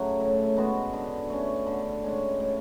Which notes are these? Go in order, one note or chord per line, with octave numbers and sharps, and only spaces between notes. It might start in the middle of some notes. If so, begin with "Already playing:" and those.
Already playing: C#3 F#3 A3 F#4
A2
G#3 B3 F#4
D3
A3 C#4
D3
G#3 C#4
A2